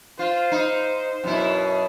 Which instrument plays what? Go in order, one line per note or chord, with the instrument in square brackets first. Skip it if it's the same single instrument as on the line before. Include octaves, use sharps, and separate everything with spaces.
[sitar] F4 [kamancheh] C5
[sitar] D#4
F#2 B2 E4